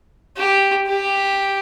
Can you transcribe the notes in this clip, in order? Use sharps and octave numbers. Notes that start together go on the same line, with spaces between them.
G4
G4